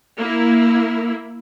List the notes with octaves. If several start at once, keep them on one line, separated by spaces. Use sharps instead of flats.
A#3 E4